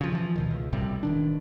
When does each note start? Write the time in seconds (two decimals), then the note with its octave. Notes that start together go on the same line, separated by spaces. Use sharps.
0.01 C#3 F3
0.12 E3 F3
0.36 D2 B2 D#3
0.51 C#2
0.72 B1 A2 C3 G3
1.03 E1 D#3 D4